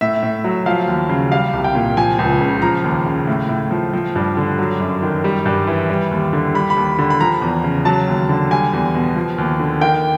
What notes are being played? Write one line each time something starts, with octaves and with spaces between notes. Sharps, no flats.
A2 E5
A2
F#3
F3 F5
D#2
C#3
G3 F5
C2
G5
A#2
F3 G#5
C#2
C#3
F3 A#5
D#2
C#3
A2
A2
F3
F3
G2
D3
F#3
F#2
D#3
G3
G2
E3
G3
D#2
D3
G3 B5
B5
D#2
D3
B5
F3 A#5
E2
C#3
F#3 A5
D#2
D3
G3 G#5
E2
B2
F3
D#2
D3
D#3 G5